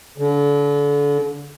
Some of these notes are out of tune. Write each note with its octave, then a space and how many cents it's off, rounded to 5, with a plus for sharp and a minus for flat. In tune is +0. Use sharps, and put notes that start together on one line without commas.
D3 -35